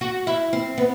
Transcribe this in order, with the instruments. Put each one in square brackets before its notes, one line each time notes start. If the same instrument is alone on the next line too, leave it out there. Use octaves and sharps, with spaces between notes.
[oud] F#4
E4
C4
B3